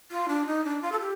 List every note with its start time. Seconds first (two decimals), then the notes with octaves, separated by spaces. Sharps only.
0.11 F4
0.28 D4
0.47 D#4
0.64 D4
0.82 F4
0.92 A4
1.00 G4